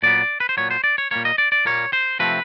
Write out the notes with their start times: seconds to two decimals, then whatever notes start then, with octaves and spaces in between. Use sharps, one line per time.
0.03 A#2 F#3 B3 D5
0.40 B4
0.49 C5
0.57 A#2 F#3 B3 C#5
0.71 C5
0.84 D5
0.98 C#5
1.11 A#2 G3 A#3 C#5
1.25 D#5
1.38 D5
1.52 D5
1.65 A#2 G3 A#3 C#5
1.93 C5
2.19 C3 F3 A3 C4 B4